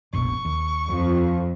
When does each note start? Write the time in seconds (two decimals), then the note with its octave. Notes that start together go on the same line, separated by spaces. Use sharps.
0.13 F1 A#1 B2 C#6
0.45 D#2
0.89 F2 F3